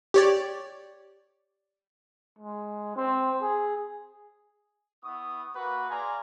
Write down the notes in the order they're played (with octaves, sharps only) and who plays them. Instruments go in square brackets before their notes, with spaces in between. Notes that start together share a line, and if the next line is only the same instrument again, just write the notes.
[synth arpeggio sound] G4 C#5 D5
[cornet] G#3
C4
G#4
[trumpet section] B3 E4 C#6 D#6
A#3 F#4 B4
G#4 D5 F5 G#5 A#5 C6